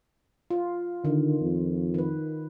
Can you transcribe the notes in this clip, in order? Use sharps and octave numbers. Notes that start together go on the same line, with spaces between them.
F4
D3 D#3
F2
D#3 B4